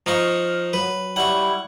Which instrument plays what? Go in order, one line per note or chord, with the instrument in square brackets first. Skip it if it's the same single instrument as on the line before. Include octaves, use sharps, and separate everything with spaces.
[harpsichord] F3 D#4 C#6 [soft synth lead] F6
[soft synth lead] F#3 [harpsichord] B4
[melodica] G3 E4 [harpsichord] F#5 C#6